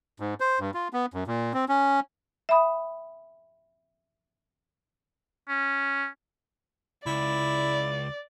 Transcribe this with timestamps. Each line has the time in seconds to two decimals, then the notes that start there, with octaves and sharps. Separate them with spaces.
0.20 G#2
0.40 C5
0.60 G2
0.74 F4
0.93 B3
1.14 F#2
1.27 A#2
1.54 C4
1.69 C#4
2.49 E5 G5 B5 D#6
5.49 C#4
7.06 C#2 E4 D5